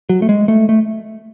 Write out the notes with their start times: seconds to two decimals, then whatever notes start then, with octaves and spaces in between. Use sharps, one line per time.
0.09 F#3
0.22 A3
0.29 G#3
0.48 A3
0.69 A3